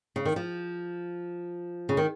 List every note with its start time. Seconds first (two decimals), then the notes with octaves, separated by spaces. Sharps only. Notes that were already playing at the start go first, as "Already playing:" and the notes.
0.16 C#3
0.25 D#3
0.36 F3
1.89 C#3
1.97 D#3